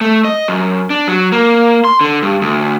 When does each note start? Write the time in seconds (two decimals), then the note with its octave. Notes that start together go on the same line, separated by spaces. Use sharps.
0.01 A3
0.25 D#5
0.48 F#2
0.90 D4
1.08 F#3
1.32 A#3
1.85 C6
2.01 D3
2.22 G2
2.41 D2